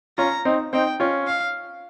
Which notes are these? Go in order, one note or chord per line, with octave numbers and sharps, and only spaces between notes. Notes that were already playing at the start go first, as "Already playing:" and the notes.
C#4 F4 A#5
C4 D#4
C4 D#4 G5
C#4 F4
F5